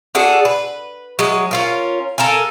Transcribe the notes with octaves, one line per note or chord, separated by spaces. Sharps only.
D4 F#4 G#4 A4
B4
F#3 G#3
C#4 F4 A#4
A4 A#4 F5 G#5